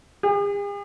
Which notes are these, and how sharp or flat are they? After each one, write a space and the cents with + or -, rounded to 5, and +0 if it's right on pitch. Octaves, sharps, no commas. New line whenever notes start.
G#4 -45